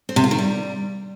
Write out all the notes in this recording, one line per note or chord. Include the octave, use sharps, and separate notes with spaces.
C4
C3
F4
D#3
G3